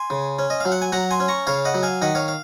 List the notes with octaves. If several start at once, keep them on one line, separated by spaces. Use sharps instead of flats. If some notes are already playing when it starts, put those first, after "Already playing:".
Already playing: G#5 C6
C#3
C#4
D#5
F#3 F5
F#5
G#5
F#3 F#5 A#5
G#5 C6
C#4
A#5 C#6
C#3 C#5 F5
D#5 F#5
F#3
F5 G#5
D#3 D#5 F#5
C#5 F5
F5